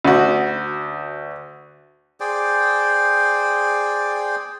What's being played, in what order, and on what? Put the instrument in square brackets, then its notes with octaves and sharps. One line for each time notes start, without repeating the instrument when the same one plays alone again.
[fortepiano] D2 F#4
[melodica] G#4 C5 D5 G5